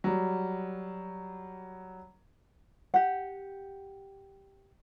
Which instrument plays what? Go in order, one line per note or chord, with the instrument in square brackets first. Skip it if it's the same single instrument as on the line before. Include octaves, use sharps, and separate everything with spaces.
[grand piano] F#3 G3
[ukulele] G4 F#5